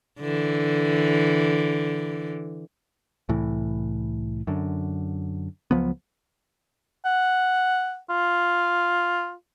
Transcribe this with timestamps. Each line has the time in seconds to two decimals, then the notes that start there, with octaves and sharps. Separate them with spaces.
0.20 D3 E3
3.29 C2 A2 E3
4.47 F#2 D3
5.71 C#2 F3 F#3 B3
7.05 F#5
8.10 F4